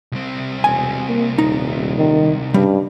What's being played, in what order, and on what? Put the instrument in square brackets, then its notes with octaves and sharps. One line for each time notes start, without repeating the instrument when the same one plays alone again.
[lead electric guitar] C2 C4
[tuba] E1 [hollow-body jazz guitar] G#5
[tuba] A#3
[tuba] D#1 [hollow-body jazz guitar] D#4
[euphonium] D#3
[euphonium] G2 [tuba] C#3 [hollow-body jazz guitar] G3